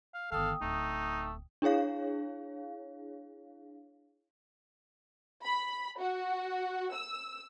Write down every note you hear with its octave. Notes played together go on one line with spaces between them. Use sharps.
F5
G1 D#3 A4 F5 G5 D#6
D1 A3 D#4
D4 E4 G#4 C#5 F5
B5
F#4
E6